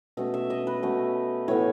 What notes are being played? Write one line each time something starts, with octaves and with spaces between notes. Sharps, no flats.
B2 A3 C#4 D#5
E5
D#5
B4
B2 A3 C#4
A2 E3 B3 C#5